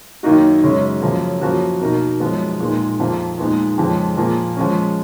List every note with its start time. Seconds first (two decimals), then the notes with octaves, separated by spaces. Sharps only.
0.23 F#2 D#3 A#3 D#4 F#4
0.63 F#2 C#3 G#3 C#4
1.01 F#2 C#3 F3 A#3
1.41 F#2 F3 A#3 C#4 F#4
1.81 B2 A#3 D#4 A#4
2.20 F#2 F3 G#3 B3
2.60 A#2 G#3 D#4 A#4
2.99 F2 F3 A#3 F4
3.38 A#2 G#3 B3 D#4
3.78 F2 C#3 F3 G#3
4.17 A#2 F3 A#3
4.56 F3 G#3 C#4